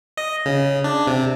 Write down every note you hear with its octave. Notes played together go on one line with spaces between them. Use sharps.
D#5
C#3
D4
C3